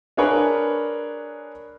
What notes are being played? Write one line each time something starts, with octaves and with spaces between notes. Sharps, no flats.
D4 G#4 A#4 B4 C#5